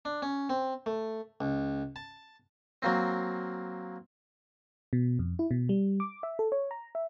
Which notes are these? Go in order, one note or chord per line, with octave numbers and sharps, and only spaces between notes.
D4
C#4
C4
A3
C#2
A5
F#3 A#3 C4
B2
F2
E4
B2
G3
D6
E5
A4
C#5
A#5
E5